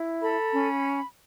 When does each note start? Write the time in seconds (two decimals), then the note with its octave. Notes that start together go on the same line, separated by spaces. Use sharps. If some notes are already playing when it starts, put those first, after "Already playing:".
Already playing: E4
0.21 A4 B5
0.52 C#4